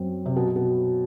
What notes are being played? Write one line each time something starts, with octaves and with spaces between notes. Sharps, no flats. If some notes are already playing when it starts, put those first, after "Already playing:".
Already playing: F#2 F#3 C4
C3
B2
B2